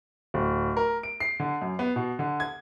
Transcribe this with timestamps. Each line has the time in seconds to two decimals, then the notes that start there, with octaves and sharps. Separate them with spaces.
0.34 D1
0.77 A#4
1.03 D7
1.20 C7
1.40 D3
1.62 F#2
1.79 B3
1.96 B2
2.19 D3
2.40 G#6